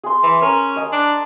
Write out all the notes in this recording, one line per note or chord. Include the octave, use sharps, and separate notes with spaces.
G#4 C6
E3
C#4 A#4
D#5 G#5 A#5
D4